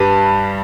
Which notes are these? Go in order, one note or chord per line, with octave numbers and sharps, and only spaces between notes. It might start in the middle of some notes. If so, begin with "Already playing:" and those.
Already playing: G2 G3 B4